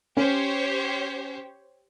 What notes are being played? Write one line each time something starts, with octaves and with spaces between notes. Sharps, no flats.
C#4 G4 C5 C#5